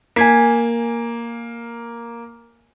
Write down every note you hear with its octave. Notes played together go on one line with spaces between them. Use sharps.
A#3 G#5 G#6 B6